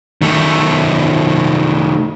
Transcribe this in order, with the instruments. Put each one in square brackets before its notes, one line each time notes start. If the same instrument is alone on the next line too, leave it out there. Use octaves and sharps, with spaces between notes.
[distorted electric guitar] D#3 A3